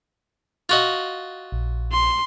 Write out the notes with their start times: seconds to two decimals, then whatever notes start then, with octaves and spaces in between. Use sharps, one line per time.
0.69 F4 F#4 D#5
1.52 A#1
1.92 C6